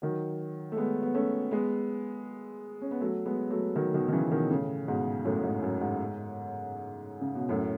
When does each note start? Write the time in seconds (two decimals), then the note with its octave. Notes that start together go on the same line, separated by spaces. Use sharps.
0.02 D#3 F#3
0.72 A3
0.77 G#3 B3
1.03 B3
1.14 A3 C#4
1.51 G#3 B3
2.81 C#4
2.91 B3
3.01 F#3 A3
3.26 G#3 B3
3.50 F#3 A3
3.76 D#3 F#3
3.94 B2 D#3
4.08 D#3
4.13 C#3 E3
4.31 B2 D#3
4.50 A2 C#3
4.87 G#2 B2
5.25 F#2 A2
5.44 G#2
5.62 F#2
5.81 G#2
7.21 C#3
7.35 B2
7.49 F#2 A2